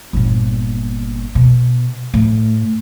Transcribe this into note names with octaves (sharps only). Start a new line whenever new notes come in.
G1 A#2
B2
A2